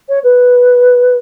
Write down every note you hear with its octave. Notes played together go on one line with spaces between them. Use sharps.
C#5
B4